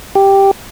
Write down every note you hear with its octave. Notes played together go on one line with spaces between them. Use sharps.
G4